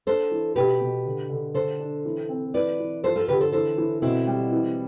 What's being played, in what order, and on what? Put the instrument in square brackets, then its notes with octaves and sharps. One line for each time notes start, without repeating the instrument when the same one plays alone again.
[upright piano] D4 [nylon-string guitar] A4 C5
[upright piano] E3
[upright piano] B2 [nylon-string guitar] G4 B4
[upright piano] B2
D3
D3
[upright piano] D3 [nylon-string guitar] A4 C5
[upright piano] D4
E3
C4
[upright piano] E3 [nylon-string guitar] B4 D5
[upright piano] E3
[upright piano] F3 [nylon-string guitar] A4 C5
[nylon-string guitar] F4 A4
[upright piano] D3 [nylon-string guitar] G4 B4
[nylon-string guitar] A4 C5
[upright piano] E3 [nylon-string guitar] A4 C5
[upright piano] E3
[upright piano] B2 [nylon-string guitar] C4 E4
[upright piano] G3
E3